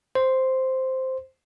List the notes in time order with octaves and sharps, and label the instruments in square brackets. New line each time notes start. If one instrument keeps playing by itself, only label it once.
[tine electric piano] C5